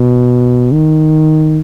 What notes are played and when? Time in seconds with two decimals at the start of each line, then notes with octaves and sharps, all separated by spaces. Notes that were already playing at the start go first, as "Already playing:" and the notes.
Already playing: B2
0.72 D#3